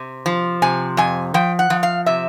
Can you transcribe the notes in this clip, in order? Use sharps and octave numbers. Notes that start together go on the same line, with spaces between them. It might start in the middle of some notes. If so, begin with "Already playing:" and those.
Already playing: C3
F3
C3 G#5
F2 G#5
F3 G5
F#5
F3
F5
C3 E5